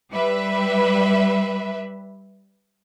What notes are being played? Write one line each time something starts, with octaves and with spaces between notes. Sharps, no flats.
G3 B4 E5